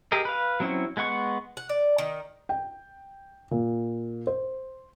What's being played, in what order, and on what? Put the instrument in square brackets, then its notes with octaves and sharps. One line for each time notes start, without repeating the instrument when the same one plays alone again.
[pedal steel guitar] G4 G#4 A#4 D#5
B4 F5
F#3 C4 C#4 E4
G#3 B3 F#5 C#6
[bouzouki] F#5
D5
D#3
[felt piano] G5
A#2
C5